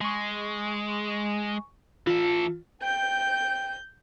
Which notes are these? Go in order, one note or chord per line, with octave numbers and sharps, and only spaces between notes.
G#3 G#5 C#6
E3 F4 A4
G5 G6